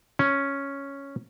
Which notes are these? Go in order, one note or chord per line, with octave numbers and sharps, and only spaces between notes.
C#4